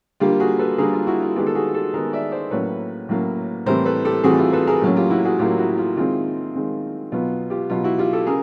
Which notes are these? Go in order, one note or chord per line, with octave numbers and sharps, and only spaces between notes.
D3 G3 A#3 F4 G4
F#4 G#4
A4 B4
D3 G3 A#3 G#4 A#4
F4
E4 F#4
F4
D#3 G#3 B3 F4 G4
A4
F#4 G#4
G4 A4
D#3 G#3 B3 G#4 A#4
D5 E5
C5 D5
A2 F#3 A#3 C#4 B4 C#5
A2 F#3 A#3 C#4
A2 E3 G3 C4 A#4 C5
A4 B4
G4 A4
A2 E3 G3 C4 F#4 G#4
F4
A4 B4
G#4 A#4
A2 F#3 A#3 C#4
F4 G4
E4 F#4
F#4 G#4
A2 F#3 A#3 C#4 F4 G4
E4 F#4
F4
D#3 G#3 C4 F4
D#3 G#3 C4
B2 F#3 B3 F4
F4 G4
B2 F#3 B3 F4
E4 F#4
F4 G4
G4 A4
C#3 G#4 A#4